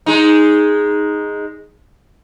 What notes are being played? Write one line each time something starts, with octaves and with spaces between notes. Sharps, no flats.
G#3 D#4